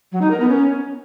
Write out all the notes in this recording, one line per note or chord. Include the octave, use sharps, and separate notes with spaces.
F#3
D#4
A#4
B3
C#4